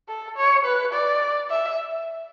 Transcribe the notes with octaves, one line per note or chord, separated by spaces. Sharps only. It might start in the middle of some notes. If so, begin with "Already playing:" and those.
A4
C#5
B4
D5
E5